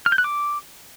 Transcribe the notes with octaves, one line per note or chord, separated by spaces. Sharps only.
F6
G6
F#6
D6